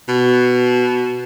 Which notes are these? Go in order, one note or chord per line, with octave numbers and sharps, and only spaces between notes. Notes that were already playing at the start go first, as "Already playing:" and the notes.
B2